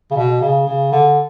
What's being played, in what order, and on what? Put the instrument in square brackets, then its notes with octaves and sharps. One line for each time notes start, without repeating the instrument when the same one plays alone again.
[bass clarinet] C#3
B2
C#3
C#3
D3